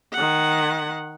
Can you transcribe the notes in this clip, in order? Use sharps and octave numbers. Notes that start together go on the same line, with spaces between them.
D#3 F#5